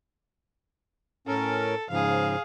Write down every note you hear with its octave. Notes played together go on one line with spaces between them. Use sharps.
A2 C#4 A4 A#4
G#2 C#3 F3 G#4 F5